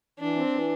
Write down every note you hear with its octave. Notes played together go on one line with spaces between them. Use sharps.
E3 D4
C4
E3